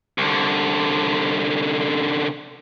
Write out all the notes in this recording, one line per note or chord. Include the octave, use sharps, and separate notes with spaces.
C2 D3